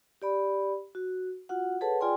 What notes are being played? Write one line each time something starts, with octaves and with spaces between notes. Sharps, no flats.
G4 D5 B5
F#4
F4 F#4 F#5
G#4 A4 B4 C#5 F#5 A5
F4 G#4 D5 G5 G#5 C6